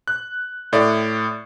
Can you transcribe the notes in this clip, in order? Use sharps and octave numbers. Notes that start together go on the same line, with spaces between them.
F#6
A2 D5